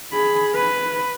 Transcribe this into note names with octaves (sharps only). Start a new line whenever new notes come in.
G#4 B5
B4